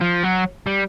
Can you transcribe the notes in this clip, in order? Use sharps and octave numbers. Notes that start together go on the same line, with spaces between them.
F3
F#3
G3